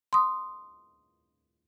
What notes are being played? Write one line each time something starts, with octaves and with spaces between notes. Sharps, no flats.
C6 D#6